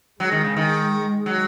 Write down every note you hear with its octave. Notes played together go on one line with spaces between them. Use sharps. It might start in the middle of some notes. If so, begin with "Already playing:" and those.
F#3 G#3
D#3
C#3
D#3 G#3
F#3